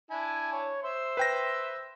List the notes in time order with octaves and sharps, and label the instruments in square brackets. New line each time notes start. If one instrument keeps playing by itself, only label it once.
[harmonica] D4 E4 [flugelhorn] G#5
[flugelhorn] C#5
[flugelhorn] C5 [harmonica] E5 C6
[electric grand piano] B4 G5 A#6